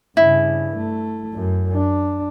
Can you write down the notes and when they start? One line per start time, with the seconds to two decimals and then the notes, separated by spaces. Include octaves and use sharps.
0.17 G2 C#3 E4
0.77 A3
1.34 F#2
1.74 D4